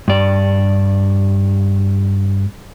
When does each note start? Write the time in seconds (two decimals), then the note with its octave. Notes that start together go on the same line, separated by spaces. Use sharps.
0.08 G2 D5